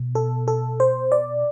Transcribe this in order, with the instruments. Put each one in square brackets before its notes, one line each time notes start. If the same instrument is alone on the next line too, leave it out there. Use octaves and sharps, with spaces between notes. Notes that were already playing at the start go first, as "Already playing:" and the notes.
Already playing: [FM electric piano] B2
A4
A4
C5
D5